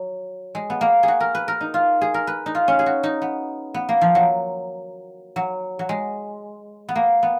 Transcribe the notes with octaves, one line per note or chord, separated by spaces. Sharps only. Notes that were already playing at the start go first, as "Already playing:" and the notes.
Already playing: F#3
G#3
B3
A#3
G#4
F#4
A#4
B4
A#4
D#4
F4
G#4
A#4
B4
D#4
F4
C#4
G#4
F#4
D#4
B3
B3
A#3
F3
F#3
F#3
F#3
G#3
B3
A#3
B3